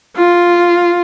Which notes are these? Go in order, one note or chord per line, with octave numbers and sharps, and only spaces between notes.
F4